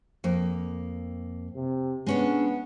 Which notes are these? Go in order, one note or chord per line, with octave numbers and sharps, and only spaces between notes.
F2 A#3
C3
G#3 B3 C#4 D4